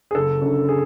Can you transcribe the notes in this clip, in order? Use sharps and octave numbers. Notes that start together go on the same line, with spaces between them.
G#4
F#1 A4
F#2 D3
G#4